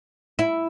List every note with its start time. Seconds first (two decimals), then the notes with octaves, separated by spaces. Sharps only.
0.39 E4